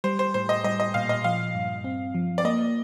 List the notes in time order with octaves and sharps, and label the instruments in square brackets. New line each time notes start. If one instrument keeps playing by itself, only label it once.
[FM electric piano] G3 [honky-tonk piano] C5
[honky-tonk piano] C5
[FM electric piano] A2 [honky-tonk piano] C5
[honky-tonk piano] D#5
[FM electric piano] G3 [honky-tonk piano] D#5
[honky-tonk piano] D#5
[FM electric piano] A#2 [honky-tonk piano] F5
[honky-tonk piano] D#5
[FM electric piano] F3 [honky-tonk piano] F5
[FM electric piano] G2
C4
F3
[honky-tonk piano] D5
[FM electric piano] A#3 [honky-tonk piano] D#5